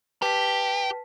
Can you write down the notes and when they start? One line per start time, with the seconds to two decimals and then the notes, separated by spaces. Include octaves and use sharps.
0.22 G4 B4 A5 B6